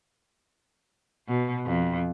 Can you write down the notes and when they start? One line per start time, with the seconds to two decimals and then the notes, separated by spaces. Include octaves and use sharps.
1.28 B2
1.66 F2